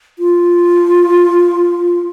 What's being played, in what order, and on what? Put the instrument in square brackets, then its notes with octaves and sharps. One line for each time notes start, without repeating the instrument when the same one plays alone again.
[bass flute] F4